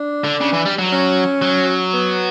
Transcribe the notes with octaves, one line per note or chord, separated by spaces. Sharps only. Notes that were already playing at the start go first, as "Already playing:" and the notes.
Already playing: D4
D3
C#3
E3
G3
F#3
C#4
F#3
B3